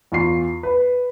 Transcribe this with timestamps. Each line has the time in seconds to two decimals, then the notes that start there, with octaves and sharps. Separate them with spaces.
0.12 E2 F4 C#6 C7
0.63 B4